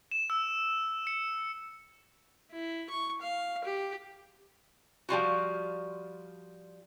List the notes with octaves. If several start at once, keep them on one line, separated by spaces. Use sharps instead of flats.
E7
E6
C#7
E4
C#6
F5
G4
F3 G3 F4 F#4